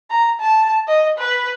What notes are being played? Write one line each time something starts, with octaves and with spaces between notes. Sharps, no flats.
A#5
A5
D#5
B4